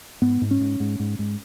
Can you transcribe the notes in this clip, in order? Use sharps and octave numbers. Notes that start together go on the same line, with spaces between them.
G#2 B3
G#2
C#4
G#2
G#2
G#2
G#2